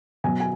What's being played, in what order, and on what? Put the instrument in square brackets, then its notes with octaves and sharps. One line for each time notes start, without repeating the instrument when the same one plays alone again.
[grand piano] B2 F#3 G#5
G#5